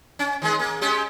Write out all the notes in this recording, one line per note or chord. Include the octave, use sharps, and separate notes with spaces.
C#4
D#3 G#3 G#4
A#3
G#3 C#4 G4